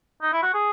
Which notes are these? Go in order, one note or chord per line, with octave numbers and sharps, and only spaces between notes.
D#4
E4
F#4
G#4